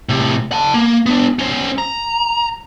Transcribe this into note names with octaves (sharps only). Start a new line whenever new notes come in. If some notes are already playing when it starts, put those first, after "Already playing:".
A2 C3
F#5 A5
A#3
B3 D4
C#4 C5
A#5